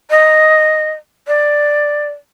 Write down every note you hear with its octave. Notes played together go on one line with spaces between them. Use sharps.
D#5
D5